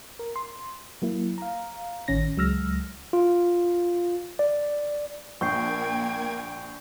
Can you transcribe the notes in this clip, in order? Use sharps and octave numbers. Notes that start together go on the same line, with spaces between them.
A#4
C6
F#3 A#3 E4
F5 A#5
A1 D#3 C#4 A#6
C#2 F#3 G#3 E6 F6 A#6
F4
D5
A#1 A#3 G5 C#6 G6 G#6 C7